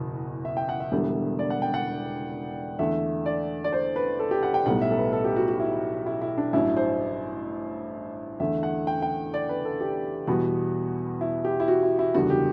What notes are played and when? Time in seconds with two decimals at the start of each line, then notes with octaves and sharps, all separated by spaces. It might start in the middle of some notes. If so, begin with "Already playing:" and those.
Already playing: F#1 E2 B2
0.45 E5
0.57 G5
0.69 F#5
0.80 E5
0.92 E1 E2 D3 G3 B3
1.39 D5
1.50 F#5
1.62 G5
1.74 F#5
2.79 E2 D3 A3 E5
3.26 D5
3.64 D5
3.73 C5
3.96 B4
4.19 A4
4.31 G4
4.43 F#5
4.54 G5
4.66 B1 A2 G3 B3 F#5
4.82 E5
4.91 A4
4.97 B4
5.13 A4
5.25 G4
5.36 F#4
5.48 F#4
5.60 E4
6.06 E4
6.22 E4
6.38 D4
6.53 A1 G2 F#3 E4
6.77 C5
8.40 E2 D3 A3 E5
8.63 F#5
8.87 G5
9.02 G5
9.34 D5
9.49 B4
9.65 A4
9.81 G4
10.27 E2 B2 G3 B3 F#4
11.21 E4
11.45 G4
11.60 E4
11.68 F#4
11.83 E4
11.99 E4
12.14 F#1 E2 D3 G3 B3 F#4
12.30 G4